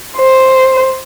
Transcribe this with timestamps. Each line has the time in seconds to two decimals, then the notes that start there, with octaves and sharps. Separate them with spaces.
0.17 C5